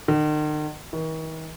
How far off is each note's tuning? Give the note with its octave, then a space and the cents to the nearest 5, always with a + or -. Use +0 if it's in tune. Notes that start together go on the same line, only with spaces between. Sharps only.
D#3 -40
D#3 +45